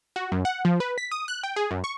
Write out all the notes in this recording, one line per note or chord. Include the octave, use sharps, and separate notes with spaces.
F#4
F#2
F#5
F3
B4
B6
D#6
F#6
G5
G#4
F#2
C#6